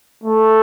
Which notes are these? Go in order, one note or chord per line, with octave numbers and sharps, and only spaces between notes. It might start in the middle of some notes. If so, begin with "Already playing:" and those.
A3